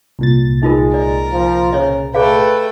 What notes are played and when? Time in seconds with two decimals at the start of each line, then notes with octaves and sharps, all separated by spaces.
0.19 C2 A#2 A6
0.63 G#3 D#4 F4 A#4
0.94 A#4 D5
1.32 F3
1.73 C#3 C5 C#5 D#5
2.14 A3 G#4 B4 D5 F5 G5